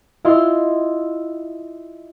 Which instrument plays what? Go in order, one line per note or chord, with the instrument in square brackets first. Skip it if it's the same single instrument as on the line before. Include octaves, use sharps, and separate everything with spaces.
[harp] E4 F4 D#5 C6